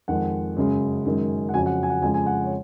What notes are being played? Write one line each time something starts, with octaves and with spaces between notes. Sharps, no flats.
F2 D#3 G#3 F#5
F#2 C#3 G#3
F#2 D#3 G#3
F#5
F2 C#3 F#3 G#5
F#5
G#5
F#5
F2 C#3 F3 G#3 G#5
G#5
F#5
C#5